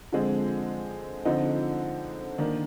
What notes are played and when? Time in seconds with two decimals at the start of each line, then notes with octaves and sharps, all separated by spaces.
0.12 D3 F3 G#3 C4
1.25 D3 F3 C4 D#4
2.38 D#3 A#3 D4